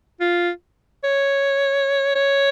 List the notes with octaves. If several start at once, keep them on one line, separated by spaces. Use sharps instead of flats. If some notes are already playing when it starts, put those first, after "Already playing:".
F4
C#5
C#5